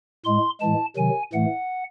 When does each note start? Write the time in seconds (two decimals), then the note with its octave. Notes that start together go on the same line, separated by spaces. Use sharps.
0.25 A2 G#3 C6
0.60 A2 E3 G#3 A5
0.97 C3 D#3 F#3 G#5
1.33 A2 E3 A3 F#5